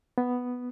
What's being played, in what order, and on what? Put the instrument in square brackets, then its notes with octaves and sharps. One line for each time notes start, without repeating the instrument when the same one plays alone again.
[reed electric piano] B3